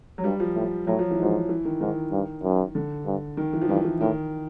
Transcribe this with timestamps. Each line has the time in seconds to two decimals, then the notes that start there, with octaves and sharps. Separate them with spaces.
0.18 F#3
0.24 G2 G3
0.40 F3
0.55 A2
0.87 A2 F#3
0.99 F3
1.11 E3
1.18 G#2 F3
1.49 E3
1.65 D#3
1.81 G#2 D#3
2.12 G2
2.43 F#2
2.75 D3
3.06 G2
3.37 D#3
3.53 E3
3.62 F3
3.69 G2 E3
3.85 E3
4.01 A2 D#3